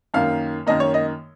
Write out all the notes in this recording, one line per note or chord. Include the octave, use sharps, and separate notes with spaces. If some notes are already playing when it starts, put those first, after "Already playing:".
F#2 D#3 A#3 F5
F#2 D#3 A#3 D#5
C#5
D#5